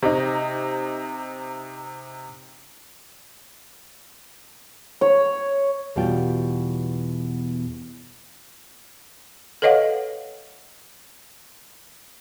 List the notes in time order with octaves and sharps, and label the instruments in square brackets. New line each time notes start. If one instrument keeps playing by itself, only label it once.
[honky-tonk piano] C3 D#4
[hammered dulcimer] C#5
[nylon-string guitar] E2 B2 G3 F4 G5
[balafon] A4 B4 C#5 D#5 F5 F#5